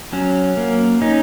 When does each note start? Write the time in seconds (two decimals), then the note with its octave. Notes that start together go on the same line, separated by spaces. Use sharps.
0.13 F#3 C#4
0.57 A#3
1.01 C#4 D#4